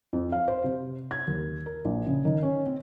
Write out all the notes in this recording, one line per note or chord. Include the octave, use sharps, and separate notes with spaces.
F2
F5
C5
C3
G#6
D#2
A#4
A#1
C#3
D#3
C#4
C4